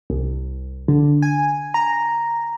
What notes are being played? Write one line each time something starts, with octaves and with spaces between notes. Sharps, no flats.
C2
D3
G#5
A#5